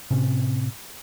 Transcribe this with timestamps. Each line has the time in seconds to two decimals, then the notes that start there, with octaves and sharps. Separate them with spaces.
0.11 A2 C3 C4 C#4